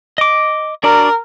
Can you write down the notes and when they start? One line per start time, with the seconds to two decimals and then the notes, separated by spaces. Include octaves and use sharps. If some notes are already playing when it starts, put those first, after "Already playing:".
0.18 D#5 D6
0.84 D4 F#4 A#4 D5